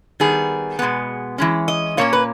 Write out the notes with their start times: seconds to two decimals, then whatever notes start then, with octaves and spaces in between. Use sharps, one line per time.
0.20 D#3 G3 B3 G#4
0.79 B2 G#3 B3
1.38 E3 G#3 C#4
1.68 D#5
1.97 A#2 A#3 C#4 C#5
2.13 B4